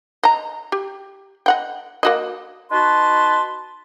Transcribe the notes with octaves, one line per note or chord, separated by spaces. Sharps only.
D#5 A#5
G4
D#5 F#5 G5
A#3 F#4 D#5
D#4 F#4 B4 A5 C6